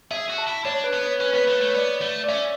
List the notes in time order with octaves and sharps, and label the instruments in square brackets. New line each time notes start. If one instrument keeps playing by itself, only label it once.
[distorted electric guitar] G#4 [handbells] E5
[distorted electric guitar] F#4
[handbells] A5
[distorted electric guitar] E4
[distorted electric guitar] D4 [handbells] C#5
[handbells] B4
[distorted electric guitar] B3
[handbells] C#5
[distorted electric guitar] C#4 [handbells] B4
[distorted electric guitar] B3 [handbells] B4
[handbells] C#5
[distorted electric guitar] A3 [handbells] B4
[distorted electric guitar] A3 [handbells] C#5
[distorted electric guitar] B3 [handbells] D5
[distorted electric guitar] A3
[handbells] D5
[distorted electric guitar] C#4 [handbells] E5